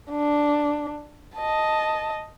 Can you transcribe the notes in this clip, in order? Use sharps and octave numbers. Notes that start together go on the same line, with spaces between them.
D4
D#5 A5